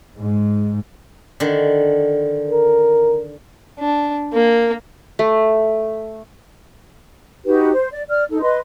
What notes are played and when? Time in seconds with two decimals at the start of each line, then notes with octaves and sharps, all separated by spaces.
0.17 G#2
1.40 D3 D#3
2.51 A#4
3.79 D4
4.33 A#3
5.19 A3
7.45 D#4 F#4 G4 B4
7.71 C5
7.92 D5
8.09 D5 F6
8.30 D#4 A4
8.41 B4 D#5 C6